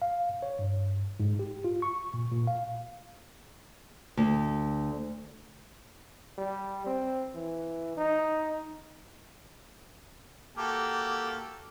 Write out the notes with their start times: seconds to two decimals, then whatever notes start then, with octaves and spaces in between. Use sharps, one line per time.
0.02 F5
0.43 C#5
0.59 G2
1.20 G#2
1.39 G4
1.64 F4
1.82 C#6
2.14 A#2
2.31 A#2
2.47 F5
4.17 D2
6.38 G3
6.86 C4
7.35 E3
7.97 D#4
10.57 A#3 F#4 G4 A4